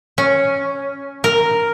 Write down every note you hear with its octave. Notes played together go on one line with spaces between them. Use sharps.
C#4
A#4